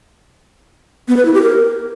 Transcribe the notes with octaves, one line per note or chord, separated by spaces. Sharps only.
B3
B4
E4
G4
A#4